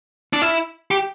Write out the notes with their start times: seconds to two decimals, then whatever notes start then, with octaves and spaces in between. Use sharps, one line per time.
0.33 D4
0.42 E4
0.91 G4